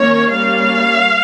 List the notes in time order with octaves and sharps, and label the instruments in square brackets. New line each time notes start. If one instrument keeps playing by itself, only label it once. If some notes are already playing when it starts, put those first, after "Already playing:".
Already playing: [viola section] D#3 A#3 C#4 C#5
G3 A#3 C#4 F5